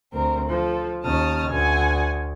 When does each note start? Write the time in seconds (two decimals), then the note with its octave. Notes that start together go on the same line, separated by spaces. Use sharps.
0.14 D2 C4 A#4
0.48 F3 A4
1.03 D#2 C#4 A5 D#6 F6
1.49 D2 F#5 G#5